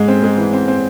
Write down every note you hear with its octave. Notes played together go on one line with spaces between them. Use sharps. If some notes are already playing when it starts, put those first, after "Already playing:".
Already playing: G#2 G#3
C4
G#3
E3
C4
C4